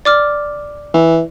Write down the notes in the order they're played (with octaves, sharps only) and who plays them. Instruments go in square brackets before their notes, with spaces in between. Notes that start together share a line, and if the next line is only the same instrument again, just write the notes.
[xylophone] D5 D6 F6
[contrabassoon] E3